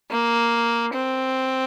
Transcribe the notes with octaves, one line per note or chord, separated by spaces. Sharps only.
A#3
C4